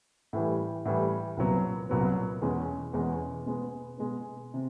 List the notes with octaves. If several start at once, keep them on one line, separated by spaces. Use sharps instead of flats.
A2 E3 G3
A2 E3 G3
C2 A#2 F#3 B3
C2 A#2 F#3 B3
E2 B2 G#3 C#4
E2 B2 G#3 C#4
B2 G#3 B3
B2 G#3 B3
C3